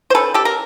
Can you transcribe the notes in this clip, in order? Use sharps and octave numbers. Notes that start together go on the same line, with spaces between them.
C5
D#3 G#3 C#4 A4 B4
G4 A4
A#4